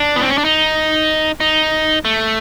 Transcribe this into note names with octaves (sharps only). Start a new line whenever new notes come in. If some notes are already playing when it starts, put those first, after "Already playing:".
Already playing: D4
B3
C4
C#4
D4
D#4
D#4
A3